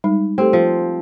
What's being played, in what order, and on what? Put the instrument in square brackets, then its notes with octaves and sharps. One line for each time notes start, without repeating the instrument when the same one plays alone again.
[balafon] G3 G#3 D#4
[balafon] A3 G4 A4 [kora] C4
[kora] F3